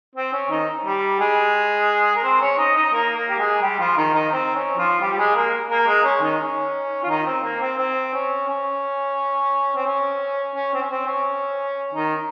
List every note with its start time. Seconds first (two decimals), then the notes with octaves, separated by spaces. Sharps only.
0.16 C4
0.33 C#4
0.50 D#3 D#4
0.85 G3 G4
1.20 G#3 G#4
2.16 A#4
2.24 C4 C5
2.41 C#4 C#5
2.58 D#4 D#5
2.76 D#4 D#5
2.93 A#3 A#4
3.16 A#3 A#4
3.29 G4
3.39 G#3 G#4
3.62 G3 G4
3.80 F3 F4
3.97 D#3 D#4
4.14 D#3 D#4
4.32 C4
4.55 C#4
4.77 F3 F4
5.01 G3 G4
5.12 G4
5.18 G#3 G#4
5.35 A#3 A#4
5.70 A#3 A#4
5.87 G#3 G#4
6.05 C#4
6.22 D#3 D#4
6.40 C#4
7.03 F4
7.09 D#3 D#4
7.27 C4
7.43 A#3
7.61 C4
7.78 C4
8.13 C#4
8.48 C#4
9.75 C4
9.86 C#4
10.55 C#4
10.74 C4
10.82 C#4
10.91 C4
11.07 C#4
11.94 D#3 D#4